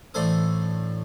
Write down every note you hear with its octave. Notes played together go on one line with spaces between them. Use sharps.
A1 A3 D4 A4 C5 D#6